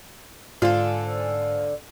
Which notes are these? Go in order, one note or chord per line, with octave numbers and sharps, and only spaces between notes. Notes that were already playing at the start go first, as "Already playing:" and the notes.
G#2 D3 F4 A4 C5 G#5